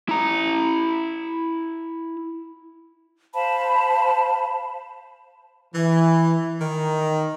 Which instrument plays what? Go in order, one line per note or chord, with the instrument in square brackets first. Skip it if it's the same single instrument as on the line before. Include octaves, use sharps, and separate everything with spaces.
[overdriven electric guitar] E4 A#5
[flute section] C5 F5 A5 B5
[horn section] E3
D#3